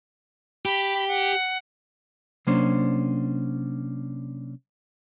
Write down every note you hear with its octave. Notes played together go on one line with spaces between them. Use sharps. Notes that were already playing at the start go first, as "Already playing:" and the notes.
G4 B5
F#5
C3 F#3 A#3 C#4 D4 C5